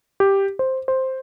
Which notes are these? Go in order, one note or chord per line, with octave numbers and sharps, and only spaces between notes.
G4
C5
C5